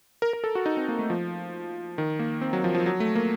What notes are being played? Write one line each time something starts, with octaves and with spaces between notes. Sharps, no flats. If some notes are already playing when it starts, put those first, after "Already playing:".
A#4
A#4
A4
F#4
D#4
C4
A#3
A3
F3
D#3
A#3
C4
F#3
F3
F3
F#3
A3
A#3